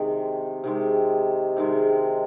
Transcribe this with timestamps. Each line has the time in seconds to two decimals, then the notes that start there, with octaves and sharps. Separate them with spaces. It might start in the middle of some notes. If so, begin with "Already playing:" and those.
Already playing: C3 D#3 G#3
0.64 C3 D#3 G#3
1.57 C3 D#3 G#3